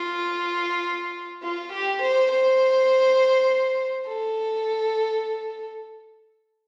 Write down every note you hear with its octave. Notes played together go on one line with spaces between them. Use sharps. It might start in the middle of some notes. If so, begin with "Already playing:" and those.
Already playing: F4
F4
G4
C5
C5
A4